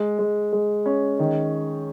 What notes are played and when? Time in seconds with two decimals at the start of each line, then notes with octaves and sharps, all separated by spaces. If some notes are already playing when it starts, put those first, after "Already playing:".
Already playing: G#3
0.19 G#3
0.52 G#3
0.86 C#4
1.19 D#3